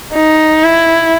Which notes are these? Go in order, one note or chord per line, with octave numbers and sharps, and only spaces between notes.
D#4
E4